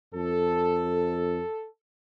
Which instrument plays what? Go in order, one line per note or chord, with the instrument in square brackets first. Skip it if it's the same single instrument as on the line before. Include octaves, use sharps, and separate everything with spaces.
[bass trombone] F2 [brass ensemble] A4